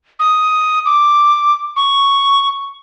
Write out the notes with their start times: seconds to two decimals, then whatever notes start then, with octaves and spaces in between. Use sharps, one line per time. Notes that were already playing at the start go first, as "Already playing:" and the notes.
0.19 D#6
0.86 D6
1.76 C#6